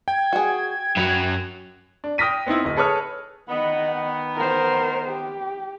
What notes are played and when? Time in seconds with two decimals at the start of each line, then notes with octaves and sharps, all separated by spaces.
0.08 G5 G#6
0.33 F#4 G#4
0.97 F#2 F#3 B5
2.04 D4
2.18 G5 D#6 F6 A#6 B6 D#7
2.46 B3 C4 D#4 E4
2.65 D1 D#5
2.77 G#4 A4 B4 C#5 D#6 F6
3.49 D#3 B3 D#5 F#5
4.36 A#4 C5
5.08 G4